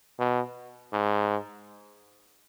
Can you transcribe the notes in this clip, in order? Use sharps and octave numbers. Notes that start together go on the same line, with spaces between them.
B2
G#2